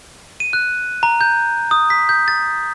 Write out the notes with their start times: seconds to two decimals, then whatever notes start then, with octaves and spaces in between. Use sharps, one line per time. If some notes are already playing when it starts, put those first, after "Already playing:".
0.40 D#7
0.53 F#6
1.03 A#5
1.21 G6
1.71 D#6
1.90 B6
2.09 G6
2.28 A6